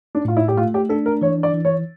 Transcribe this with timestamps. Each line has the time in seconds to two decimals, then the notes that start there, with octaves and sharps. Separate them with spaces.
0.15 D4
0.25 A2 F4
0.37 E4
0.48 G4
0.57 A3 F4
0.74 G4
0.89 D4 A4
1.06 A#4
1.21 E3 C#5
1.43 D5
1.54 E3
1.65 C#5